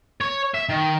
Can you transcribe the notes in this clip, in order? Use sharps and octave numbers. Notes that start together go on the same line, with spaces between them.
C#5
E5
D#3